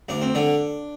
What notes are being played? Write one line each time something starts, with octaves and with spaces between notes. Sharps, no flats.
D2 D4
C4
D3 D4